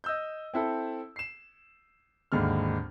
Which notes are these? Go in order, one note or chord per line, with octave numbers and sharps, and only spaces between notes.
D#5 E6 G6
C4 E4 A4
C7 E7
G#1 D#2 D3 G#3 F6